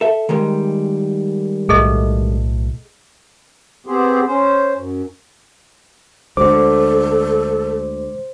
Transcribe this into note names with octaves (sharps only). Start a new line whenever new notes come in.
A4 E5
D#3 G3 G#3
B1 A2 G#4 A4 D#5
B3 C4 G4 G#4 C5
C#4 C5
F#2
D2 D3 G#3 A4 C5 D6